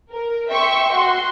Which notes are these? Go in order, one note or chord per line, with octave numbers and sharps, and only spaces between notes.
A#4
E5 G5 C6 C#6
F#4 C6